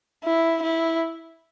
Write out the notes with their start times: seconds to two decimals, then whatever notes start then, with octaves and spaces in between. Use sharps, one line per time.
0.24 E4
0.63 E4